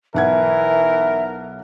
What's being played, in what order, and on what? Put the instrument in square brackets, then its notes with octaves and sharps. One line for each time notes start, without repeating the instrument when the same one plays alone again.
[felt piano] B1 F#5 G#6 [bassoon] E3 [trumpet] A#4 [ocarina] E5